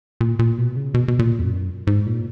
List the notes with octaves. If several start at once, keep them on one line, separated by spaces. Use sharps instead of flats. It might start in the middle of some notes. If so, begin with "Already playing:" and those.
A#2
A#2
B2
C#3
B2
B2
A#2
E2
F#2
G#2
A#2